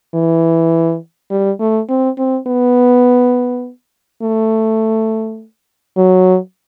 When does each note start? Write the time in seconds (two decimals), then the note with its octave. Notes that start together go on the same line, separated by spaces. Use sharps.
0.15 E3
1.31 G3
1.60 A3
1.89 C4
2.18 C4
2.47 B3
4.22 A3
5.97 F#3